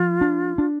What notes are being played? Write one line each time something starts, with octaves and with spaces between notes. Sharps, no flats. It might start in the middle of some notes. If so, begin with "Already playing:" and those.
Already playing: F3 F4
D4
D4